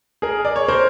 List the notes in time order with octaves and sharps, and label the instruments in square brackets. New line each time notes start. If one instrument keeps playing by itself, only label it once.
[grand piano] G#4 A#4
D5
C#5
A#4 C5